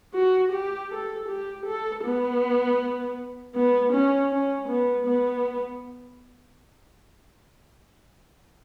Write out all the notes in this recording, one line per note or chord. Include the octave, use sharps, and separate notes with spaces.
F#4
G4
A4
G4
A4
B3
B3
C#4
C#4
B3
B3